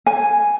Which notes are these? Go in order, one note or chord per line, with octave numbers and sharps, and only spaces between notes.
G#5